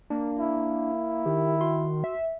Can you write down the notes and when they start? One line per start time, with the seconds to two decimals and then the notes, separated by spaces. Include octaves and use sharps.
0.10 A#3 D4
0.39 E4
1.26 D#3 G4
1.61 F#4 C6
2.04 E5